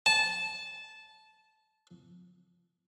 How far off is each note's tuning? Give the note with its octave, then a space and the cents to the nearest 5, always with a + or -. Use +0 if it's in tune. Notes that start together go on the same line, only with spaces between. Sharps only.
A5 -15